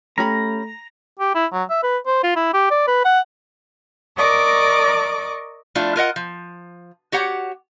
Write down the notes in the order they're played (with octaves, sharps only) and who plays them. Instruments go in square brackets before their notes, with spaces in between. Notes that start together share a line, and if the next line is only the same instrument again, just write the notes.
[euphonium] A3 [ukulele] C#4 G4 B5 [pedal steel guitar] A#5
[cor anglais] G4
E4
F#3
E5
B4
C5
F4
E4
G4
D5
B4
F#5
[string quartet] A#4 D5 D#5 C#6 D6
[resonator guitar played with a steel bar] F3 A3 D4 E4 F4
F4 A#4 D#5 F#5
F3
F#4 G4 C#5 F#5